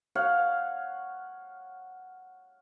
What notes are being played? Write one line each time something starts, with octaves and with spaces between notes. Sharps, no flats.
C#5 F5 F#5